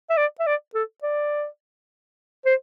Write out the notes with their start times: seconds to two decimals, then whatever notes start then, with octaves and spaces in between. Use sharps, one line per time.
0.10 E5
0.17 D5
0.40 E5
0.46 D5
0.74 A4
1.03 D5
2.46 C5